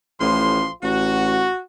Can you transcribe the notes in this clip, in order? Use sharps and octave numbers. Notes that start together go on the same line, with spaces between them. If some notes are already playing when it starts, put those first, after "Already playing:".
A1 A2 F3 C6
A1 F#4